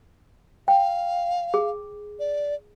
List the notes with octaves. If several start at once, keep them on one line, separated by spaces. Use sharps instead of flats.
F5 G5
G#4
D5